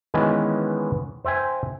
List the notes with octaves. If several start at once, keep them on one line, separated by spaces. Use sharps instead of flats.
D#3 E3 G#3 B3 C#4
C5 E5 G5 G#5